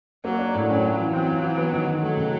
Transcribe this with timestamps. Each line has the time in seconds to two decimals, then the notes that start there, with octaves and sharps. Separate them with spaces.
0.24 F#3 A#3
0.39 D4
0.55 A2
0.69 F#3 C#4
0.85 F4
0.99 E3
1.13 F#3 C4
1.28 F4
1.43 E3
1.58 B3
1.73 D#3
1.88 D#3
2.02 F#3 A3
2.17 C#3